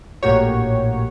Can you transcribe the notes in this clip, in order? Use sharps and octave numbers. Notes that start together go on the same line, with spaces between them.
A#1 A2 A#3 F#4 G4 C#5